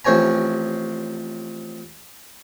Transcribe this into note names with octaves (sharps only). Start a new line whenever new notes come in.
A1 C3 F3 C#5 G#5 A#5